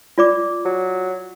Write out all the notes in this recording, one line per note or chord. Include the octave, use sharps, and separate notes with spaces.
F4 D5 D6
F#3